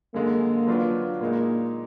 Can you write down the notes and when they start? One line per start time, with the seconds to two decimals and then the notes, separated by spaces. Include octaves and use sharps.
0.14 F#2 D3 G#3 A#3
0.67 F#3 D4 F4 B4
1.20 A#2 G#3 A#3 D#4